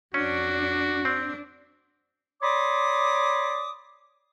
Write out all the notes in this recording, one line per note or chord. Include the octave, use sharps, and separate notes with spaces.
F2 C#4 D4 F#4
C4 D4
C#5 D5 B5 C6 D6 D#6